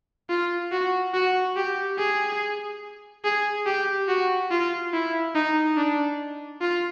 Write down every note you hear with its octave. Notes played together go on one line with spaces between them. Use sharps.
F4
F#4
F#4
G4
G#4
G#4
G4
F#4
F4
E4
D#4
D4
F4